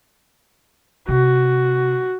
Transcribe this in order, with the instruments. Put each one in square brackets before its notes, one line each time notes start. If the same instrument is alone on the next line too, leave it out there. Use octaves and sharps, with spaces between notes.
[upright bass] C3 [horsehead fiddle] F#4